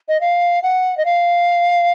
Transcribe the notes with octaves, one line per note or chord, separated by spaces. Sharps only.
D#5
F5
F#5
D#5
F5